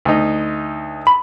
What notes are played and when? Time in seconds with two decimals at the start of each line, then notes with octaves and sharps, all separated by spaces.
0.05 D2 D#4
1.07 B5